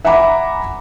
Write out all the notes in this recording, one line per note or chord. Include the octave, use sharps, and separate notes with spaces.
E5 F#5 G#5 A#5 B5 D6